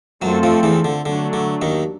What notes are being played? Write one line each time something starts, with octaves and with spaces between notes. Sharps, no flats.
F#2 F#3 A3 C4 F4 A4
F2 F3
E2 E3
D3
D3 F#3 A3 D4
D3
D#2 D#3